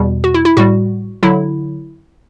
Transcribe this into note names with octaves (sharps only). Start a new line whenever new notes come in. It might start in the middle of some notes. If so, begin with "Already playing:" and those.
Already playing: E2 B2 G3
F#4
E4
E4
A2 G3 F#4
D3 F#3 E4